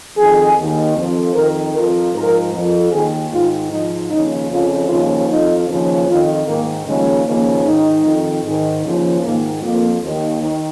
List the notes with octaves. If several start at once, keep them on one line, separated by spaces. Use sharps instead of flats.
F2 D#3 G#4
D#2 D#3
F2 F3
F2 D#3 A#4
F2 F3 A#4
G#2 F3 A#4
F2 F3
D#2 D#3 G#4
G#2 D#3 F4
G#2 F3 D#4
D#2 C#3 F3 D#4
F2 C#3 F3 F4
D#2 C#3 F3 F4
F2 F3 D#4
D#2 C#3 F3
F2 D#3 F4
G#2 D#3 A#3
D#2 C#3 F3 G#3
D#2 C#3 F3 A#3
G#2 D#3 D#4
F2 D#3
G#2 D#3
D#2 C#3 F3
G#2 D#3 A#3
F2 F3 A#3
D#2 D#3
D#3 D#4